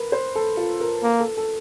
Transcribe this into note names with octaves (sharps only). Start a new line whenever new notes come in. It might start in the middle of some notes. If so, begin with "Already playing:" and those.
Already playing: A#4 B4
C5
A4
F4
A#4
A#3
A4
A4